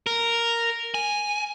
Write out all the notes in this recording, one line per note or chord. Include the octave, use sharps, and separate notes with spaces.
A#4
G#5